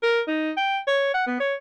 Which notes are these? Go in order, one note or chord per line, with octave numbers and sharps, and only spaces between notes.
A#4
D#4
G5
C#5
F#5
B3
C#5